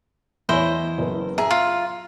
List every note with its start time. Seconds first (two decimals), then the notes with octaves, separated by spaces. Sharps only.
0.49 E2 E4 C5 C#5 D#5
0.98 F#1 B3
1.38 G#4 E5 A#5
1.50 F4